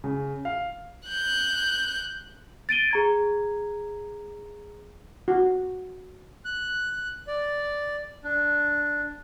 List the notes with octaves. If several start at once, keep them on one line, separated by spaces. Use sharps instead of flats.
C#3
F5
F#6 G6
A6 D7 D#7 G7
G#4 A#5 G#6
F#4
F#6
D5
D4